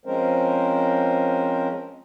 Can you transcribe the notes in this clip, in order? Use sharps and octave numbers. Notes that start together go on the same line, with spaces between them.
F3 G#3 C4 C#4 A#4 C5